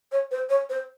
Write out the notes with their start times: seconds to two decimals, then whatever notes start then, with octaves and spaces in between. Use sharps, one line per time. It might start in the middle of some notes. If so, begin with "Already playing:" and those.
0.12 C#5
0.31 C5
0.49 C#5
0.70 C5